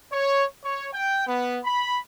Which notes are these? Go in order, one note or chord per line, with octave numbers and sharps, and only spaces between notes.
C#5
C#5
G5
B3
B5